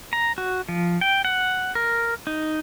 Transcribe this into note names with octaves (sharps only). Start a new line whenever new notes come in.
A#5
F#4
F3
G5
F#5
A#4
D#4